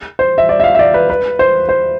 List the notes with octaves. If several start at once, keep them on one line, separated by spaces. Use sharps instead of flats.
C5
E5
D5
E5
F5
E5
D5
B4
B4
C5
C5